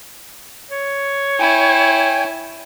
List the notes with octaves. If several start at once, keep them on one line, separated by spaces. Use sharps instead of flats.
C#5
E4 G5 G#5